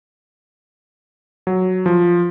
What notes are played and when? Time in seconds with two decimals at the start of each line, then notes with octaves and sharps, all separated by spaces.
1.47 F#3
1.86 F3